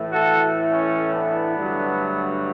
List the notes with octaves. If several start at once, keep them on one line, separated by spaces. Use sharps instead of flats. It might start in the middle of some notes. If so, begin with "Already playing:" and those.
Already playing: A2 E3 A3
F#4 A4
C#4
B3 D4
G2 D3 F#3 A3